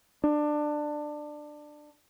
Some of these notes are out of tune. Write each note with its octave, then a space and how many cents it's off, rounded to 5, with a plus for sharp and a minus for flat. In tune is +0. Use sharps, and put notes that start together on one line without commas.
D4 +20